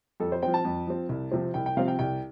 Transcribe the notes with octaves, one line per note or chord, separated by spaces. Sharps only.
F2 A4
C5
F3 C4 G5
A5
F2
F3 C4
C2
C3 F3 C4
C2 G5
G5
C3 F3 C4 F5
G5
C2 G5